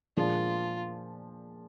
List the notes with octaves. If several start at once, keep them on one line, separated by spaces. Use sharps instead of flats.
A#2 F3 G#3 D4 F4